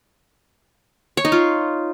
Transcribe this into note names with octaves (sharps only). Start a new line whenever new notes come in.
C#5
D#4
F4